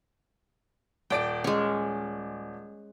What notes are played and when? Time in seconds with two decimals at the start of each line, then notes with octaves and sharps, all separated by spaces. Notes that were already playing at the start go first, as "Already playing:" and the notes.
1.10 D#1 D5 G5 D7
1.44 G#3 C#4